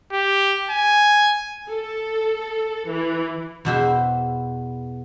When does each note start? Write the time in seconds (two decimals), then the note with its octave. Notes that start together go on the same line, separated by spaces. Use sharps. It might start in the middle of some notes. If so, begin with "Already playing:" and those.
0.12 G4
0.70 G#5
1.69 A4
2.90 E3
3.65 E2 B2 C5 E5